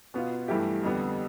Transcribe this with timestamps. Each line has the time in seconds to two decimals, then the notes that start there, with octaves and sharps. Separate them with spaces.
0.14 B2 B3 F4
0.48 G2 E3 A3 E4 G4
0.83 F2 D3 G3 B3